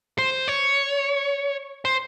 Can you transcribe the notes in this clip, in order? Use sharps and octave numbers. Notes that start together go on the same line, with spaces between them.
C5
C#5
C5